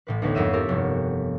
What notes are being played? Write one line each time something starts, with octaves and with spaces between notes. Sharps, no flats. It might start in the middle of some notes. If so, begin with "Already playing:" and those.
A1 A2 B4
D2 A3 B3 D#4 B4 C#5
F2 G#2 A#4 E5 D#7 E7
E4 G4 A4 A#4 C#5
F1 G2 B3